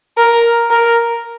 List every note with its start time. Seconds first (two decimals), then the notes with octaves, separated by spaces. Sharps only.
0.18 A#4
0.70 A#4